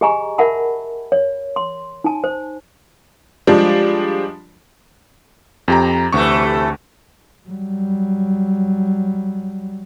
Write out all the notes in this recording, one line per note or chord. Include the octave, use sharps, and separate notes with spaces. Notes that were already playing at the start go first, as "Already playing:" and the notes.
G4 G#4 D#5 G#5 A#5 C#6
A#4 E5 F#5 A5 B5
C#5
C6
D#4 G#5 A5
C5
F3 G3 G#3 D4
F2 G4 A#5
D2 C3 E3 A3 C#6
F#3 G3